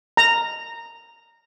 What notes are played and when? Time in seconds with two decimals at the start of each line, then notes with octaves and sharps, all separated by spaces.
0.17 A#5